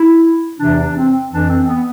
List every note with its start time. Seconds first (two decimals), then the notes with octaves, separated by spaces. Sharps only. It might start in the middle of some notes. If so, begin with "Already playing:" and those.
Already playing: E4
0.60 E2 C3 E3 D4
0.78 D4
0.96 C4
1.32 F2 E3 D4
1.49 C4
1.66 B3